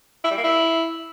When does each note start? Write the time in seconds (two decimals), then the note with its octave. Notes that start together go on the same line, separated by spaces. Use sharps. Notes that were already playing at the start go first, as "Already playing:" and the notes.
0.24 E4
0.31 G3
0.37 A#3
0.44 E4